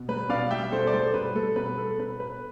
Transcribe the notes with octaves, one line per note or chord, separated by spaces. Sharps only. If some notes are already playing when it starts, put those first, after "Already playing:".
Already playing: B2
G3 B4
B2 D5 F5
G3 E5 G5
B2 A4 C5
D5
G3 A4 C5
B2 B4
G3 A4
B2 B4
A3 A4
B2 B4
A3 B4